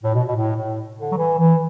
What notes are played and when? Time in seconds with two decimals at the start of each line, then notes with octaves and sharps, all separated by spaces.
0.03 A2
0.15 B2
0.27 B2
0.35 A2
0.56 A2
0.97 D3
1.12 F#3
1.17 E3
1.38 E3